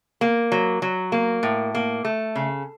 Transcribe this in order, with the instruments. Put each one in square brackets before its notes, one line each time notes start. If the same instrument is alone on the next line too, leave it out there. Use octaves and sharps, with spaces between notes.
[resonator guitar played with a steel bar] A#3
F#3
F#3
A#3
A2
A#3
A3
C#3